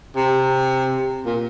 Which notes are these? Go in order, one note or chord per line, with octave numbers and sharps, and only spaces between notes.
C3
A#2